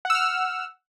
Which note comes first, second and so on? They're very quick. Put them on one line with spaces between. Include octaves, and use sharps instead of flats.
F#5 E6 F6